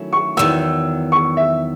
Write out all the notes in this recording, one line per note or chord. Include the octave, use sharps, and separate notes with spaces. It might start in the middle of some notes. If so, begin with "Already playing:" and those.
Already playing: D#3 F#3 A3 C#4 E4
C#6
E2 D#3 F#3 E6
C#6
E5